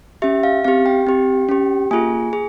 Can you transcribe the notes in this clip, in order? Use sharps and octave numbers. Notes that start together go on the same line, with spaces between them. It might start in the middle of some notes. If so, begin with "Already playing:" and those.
C#4 G4 E5
F5
C4 G4 F5
G5
C4 G4
C#4 G4
A#3 F4 G#4 G#5
G#4